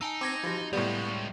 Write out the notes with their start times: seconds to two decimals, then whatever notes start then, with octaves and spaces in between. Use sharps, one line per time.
0.01 D#4 G#5 A5 E6
0.21 C4 D6 G#6 A#6
0.43 F3 F#4 G4
0.73 A2 G3 G#3 B3 F4 D5